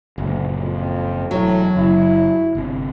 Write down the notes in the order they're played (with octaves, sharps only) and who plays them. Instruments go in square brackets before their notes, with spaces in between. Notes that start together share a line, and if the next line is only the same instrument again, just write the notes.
[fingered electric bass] F#1 A#2 [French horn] D2
[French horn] F2
[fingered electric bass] E1 [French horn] A2 [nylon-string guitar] F#3
[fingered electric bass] F#1 [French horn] E4
[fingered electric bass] G1 C3